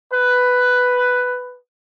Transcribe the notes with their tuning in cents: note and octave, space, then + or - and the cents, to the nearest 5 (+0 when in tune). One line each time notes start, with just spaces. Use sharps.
B4 +5